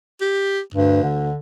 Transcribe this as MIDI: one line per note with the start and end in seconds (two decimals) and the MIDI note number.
0.21 0.60 67
0.74 1.31 38
0.74 1.01 43
1.03 1.38 50